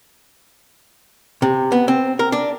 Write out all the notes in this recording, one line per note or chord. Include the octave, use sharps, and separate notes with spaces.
C3
B3
C4
A#4
D4